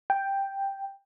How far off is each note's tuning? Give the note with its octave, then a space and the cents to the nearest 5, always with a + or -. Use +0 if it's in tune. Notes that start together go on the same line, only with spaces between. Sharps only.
G5 +5